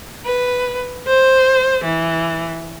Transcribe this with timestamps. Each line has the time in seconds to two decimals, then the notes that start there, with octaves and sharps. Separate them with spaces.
0.24 B4
1.06 C5
1.83 E3